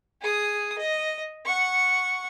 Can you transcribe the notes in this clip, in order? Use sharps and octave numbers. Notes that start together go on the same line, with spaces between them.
G#4 D#6
D#5
F#5 C#6